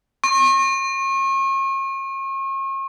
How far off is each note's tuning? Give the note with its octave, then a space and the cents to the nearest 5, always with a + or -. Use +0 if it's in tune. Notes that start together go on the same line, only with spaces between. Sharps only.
C#6 -40